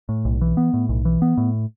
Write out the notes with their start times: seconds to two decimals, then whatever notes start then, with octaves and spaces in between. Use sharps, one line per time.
0.09 A2
0.25 B1
0.41 E3
0.57 B3
0.74 A2
0.89 B1
1.05 E3
1.22 B3
1.38 A2